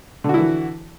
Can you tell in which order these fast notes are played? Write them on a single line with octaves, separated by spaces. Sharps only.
D3 F#4 E4 E3